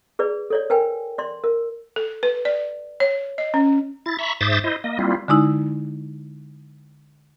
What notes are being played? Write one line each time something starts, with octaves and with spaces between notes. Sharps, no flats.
G#4 B4 D5
A4 C#5 D5
A#4 B4 G5 G#5
D5 C6
A#4
A4
B4
D5
C#5
D#5
C#4
E4 A6
E5 A#5 B5 C#6
G#2 C5 E5 D6 D#6 A6
E4 C5 D#5
A#3 D#5
G3 A#3 C4 E4 F4
D3 G#3 D#4 E4